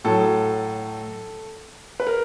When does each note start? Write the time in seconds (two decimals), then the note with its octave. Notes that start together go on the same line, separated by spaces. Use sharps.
0.05 A2 F#3 A4
2.00 B4
2.07 A#4